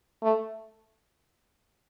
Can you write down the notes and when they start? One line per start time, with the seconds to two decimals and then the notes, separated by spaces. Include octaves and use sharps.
0.22 A3